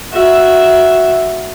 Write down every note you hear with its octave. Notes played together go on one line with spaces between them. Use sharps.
F#4 E5